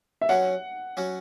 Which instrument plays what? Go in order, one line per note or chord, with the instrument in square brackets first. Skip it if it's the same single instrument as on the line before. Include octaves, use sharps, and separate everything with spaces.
[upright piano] E5
[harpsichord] F#3 C#4 F#4 [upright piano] F#5
[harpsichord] F#3 C#4 F#4